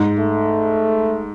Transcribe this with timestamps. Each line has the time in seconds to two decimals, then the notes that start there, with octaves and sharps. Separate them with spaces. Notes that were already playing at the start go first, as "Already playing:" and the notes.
Already playing: G#2
0.19 A3